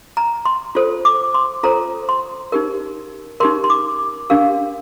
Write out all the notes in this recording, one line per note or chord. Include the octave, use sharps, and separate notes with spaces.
A#5
C6
F4 A4 C5
D6
C6
F4 A4 C5 A#5
C6
D#4 G4 A#4
D#4 G4 A#4 C6
C6
D6
D4 G4 A#4 F5